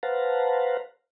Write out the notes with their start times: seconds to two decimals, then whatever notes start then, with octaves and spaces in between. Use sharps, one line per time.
0.03 B4 C5 F5 F#5 A5 A#5